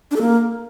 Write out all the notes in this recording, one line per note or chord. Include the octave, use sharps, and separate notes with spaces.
D4
A4
A#3